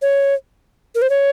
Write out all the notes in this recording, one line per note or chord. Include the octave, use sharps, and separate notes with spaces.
C#5
A#4
C5
C#5